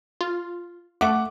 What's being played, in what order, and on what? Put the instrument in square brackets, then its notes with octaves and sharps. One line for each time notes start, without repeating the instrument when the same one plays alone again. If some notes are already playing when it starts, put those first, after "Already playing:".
[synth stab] F4
[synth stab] A3 D6 [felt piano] F#5